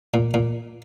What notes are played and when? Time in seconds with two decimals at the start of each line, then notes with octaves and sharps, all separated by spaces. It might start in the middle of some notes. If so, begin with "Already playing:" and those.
0.14 A#2
0.34 A#2